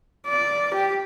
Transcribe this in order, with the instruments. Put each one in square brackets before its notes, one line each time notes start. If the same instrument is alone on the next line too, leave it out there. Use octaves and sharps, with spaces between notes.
[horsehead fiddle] D5
G4